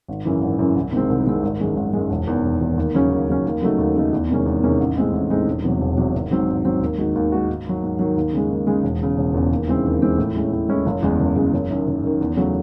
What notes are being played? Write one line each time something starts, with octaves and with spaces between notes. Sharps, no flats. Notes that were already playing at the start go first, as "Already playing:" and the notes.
G#1
F#2 C#3 E3
G#1
F#2 C#3 E3
C2
C3 D#3 G#3 C4
C2
C3 D#3 G#3 C4
G#1
F#2 D#3 G#3
G#1
F#2 D#3 G#3
E1
E2 D#3
E1
E2 D#3
D#2
C#3 F#3 C#4
D#2
C#3 F#3 C#4
D#2
C#3 F#3 A3 D#4
D#2
C#3 F#3 A3 D#4
E2
C3 D#3 G#3 C#4
E2
C3 D#3 G#3 C#4
A1
A2 G#3 C4 D#4
A1
A2 G#3 C4 D#4
E1
E2 C3 F#3
E1
E2 C3 F#3
G#1
G#2 F#3 C4
G#1
G#2 F#3 C4
D#2
D#3 G#3 D#4 F#4
D#2
D#3 G#3 D#4 F#4
G#2
D#3 F#3
G#2
D#3 F#3
D#2
C#3 G#3
D#2
C#3 G#3
E1
E2 C#3
E1
E2 C#3
D#2
C#3 E3 G#3 C4
D#2
C#3 E3 G#3 C4
A2
G#3 C#4 E4
A2
G#3 C#4 E4
F#1
E2 C#3 G#3
F#1
E2 C#3 G#3
F#1
F#2 D#3
F#1
F#2 D#3
E2
C#3 F#3 A3